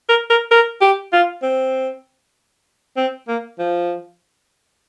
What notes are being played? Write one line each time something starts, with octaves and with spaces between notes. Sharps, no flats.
A#4
A#4
A#4
G4
F4
C4
C4
A#3
F3